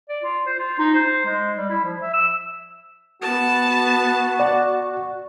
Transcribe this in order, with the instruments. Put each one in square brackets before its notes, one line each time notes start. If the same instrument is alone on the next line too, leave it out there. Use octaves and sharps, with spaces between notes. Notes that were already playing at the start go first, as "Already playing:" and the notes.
[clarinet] D5
F4
C5
F4
D#4
C5
G#3
G3
E4
F3
E5
E6
[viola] B3 A5 [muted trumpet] F#4
[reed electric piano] D5 F#5